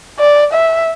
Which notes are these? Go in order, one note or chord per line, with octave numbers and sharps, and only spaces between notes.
D5
E5